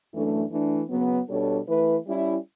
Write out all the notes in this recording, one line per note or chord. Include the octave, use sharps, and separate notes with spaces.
F#2 E3 A3 D4
E3 A3 D4
C#3 F#3 B3
B2 G3 D4 A4 C#5
E3 A3 E4 B4
G3 C#4 E4